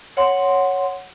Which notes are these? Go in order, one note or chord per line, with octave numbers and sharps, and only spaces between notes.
C#5 F#5 C6